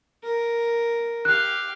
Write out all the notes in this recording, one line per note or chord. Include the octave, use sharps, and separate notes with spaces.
A#4
G4 F5 F#6